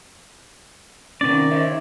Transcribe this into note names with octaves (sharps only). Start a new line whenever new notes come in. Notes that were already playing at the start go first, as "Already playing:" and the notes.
C3 D#3 B3 C#4 D5
C5 C#5 E5